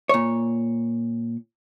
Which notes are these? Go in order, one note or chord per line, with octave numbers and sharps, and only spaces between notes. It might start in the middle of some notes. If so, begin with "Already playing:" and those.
A#2 C#5